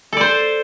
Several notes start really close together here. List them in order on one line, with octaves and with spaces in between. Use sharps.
A4 D5 C5